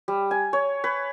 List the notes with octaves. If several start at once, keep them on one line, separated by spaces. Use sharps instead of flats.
G3
G#5
C#5
B4